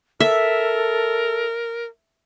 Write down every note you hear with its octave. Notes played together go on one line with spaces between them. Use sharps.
A4 A#4 E5